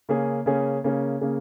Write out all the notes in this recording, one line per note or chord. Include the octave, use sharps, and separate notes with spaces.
C#3 A#3 C#4 G#4
C#3 A#3 C#4 G#4
C#3 A#3 C#4 G#4
C#3 A#3 C#4 G#4